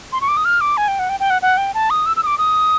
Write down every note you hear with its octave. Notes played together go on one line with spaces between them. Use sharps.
C6
C#6
D6
D#6
F6
D6
G#5
G5
F#5
G5
G5
F#5
F#5
G5
A5
D#6
E6
E6
D#6
D6
D#6